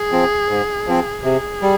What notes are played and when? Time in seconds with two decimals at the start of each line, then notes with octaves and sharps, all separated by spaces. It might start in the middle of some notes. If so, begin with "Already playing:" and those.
Already playing: G#4
0.11 F3 C4
0.49 G#2
0.87 F3 C4
1.24 C3 G#4
1.62 G3